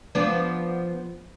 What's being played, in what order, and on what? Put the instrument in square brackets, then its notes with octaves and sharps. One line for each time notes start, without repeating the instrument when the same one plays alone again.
[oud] F3 B3 D4